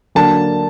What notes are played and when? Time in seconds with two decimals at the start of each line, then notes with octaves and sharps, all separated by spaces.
0.15 D3 F#3 A#3 D4 A5